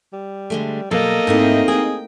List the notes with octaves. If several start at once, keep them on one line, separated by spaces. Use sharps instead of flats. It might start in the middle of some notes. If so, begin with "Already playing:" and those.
G3
D3 G#3 A3
B2 F#3 G3 A#3 A4 D#5
G#2 A3 C4 D#4 E4
G#4 G5